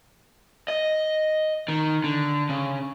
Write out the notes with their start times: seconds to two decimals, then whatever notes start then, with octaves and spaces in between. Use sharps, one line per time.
0.68 D#5
1.68 D#3
2.04 D3
2.49 C#3